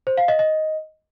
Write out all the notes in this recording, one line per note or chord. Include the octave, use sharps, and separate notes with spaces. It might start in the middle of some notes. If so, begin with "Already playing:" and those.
C5
F5
D#5
D#5